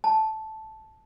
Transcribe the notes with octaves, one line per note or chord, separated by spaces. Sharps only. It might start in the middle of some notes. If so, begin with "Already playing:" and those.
A5